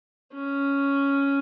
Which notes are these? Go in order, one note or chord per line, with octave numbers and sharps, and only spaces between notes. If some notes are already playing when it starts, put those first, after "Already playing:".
C#4